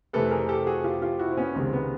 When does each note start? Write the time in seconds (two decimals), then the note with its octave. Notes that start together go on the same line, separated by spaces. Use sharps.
0.13 F2 C3 E3 A3 A4 B4
0.31 G#4 A#4
0.49 G4 A4
0.67 F#4 G#4
0.84 F4 G4
1.02 F4 G4
1.19 E4 F#4
1.32 C4
1.37 B3 C#4
1.55 C#2 C3 D#3 G#3 C4
1.73 B3